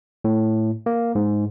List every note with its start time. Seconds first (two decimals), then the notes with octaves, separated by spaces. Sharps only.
0.24 A2
0.86 A#3
1.15 G#2